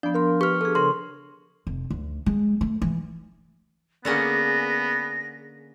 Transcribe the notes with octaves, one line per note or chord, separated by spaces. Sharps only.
F3 B3 D4 D5
A#4 F5 C6
G4 B4 C#6 F6
D4 G#4 A4
C#3 A#4 C6
F1
D2
G#3
A3
E3
D3 A#3 B3 C#4 G#4 D5 A#6